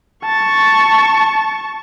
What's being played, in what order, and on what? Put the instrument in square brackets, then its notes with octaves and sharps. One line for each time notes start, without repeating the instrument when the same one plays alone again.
[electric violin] A5 C#6